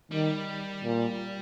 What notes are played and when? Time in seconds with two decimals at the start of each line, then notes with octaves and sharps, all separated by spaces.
0.11 D#3 G3
0.85 A#2